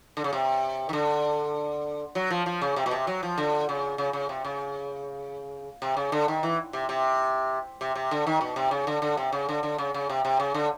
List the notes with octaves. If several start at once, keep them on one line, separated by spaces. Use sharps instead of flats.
D3
C#3
C3
D#3
D3
F#3
F3
F3
C#3
C3
B2
C3
F#3
F3
D3
C#3
C#3
C#3
C3
C#3
C3
C#3
D3
D#3
E3
C3
C3
C3
C3
D3
D#3
B2
C3
C#3
D3
D3
C3
C#3
D3
D3
C#3
C#3
C3
C3
C#3
D3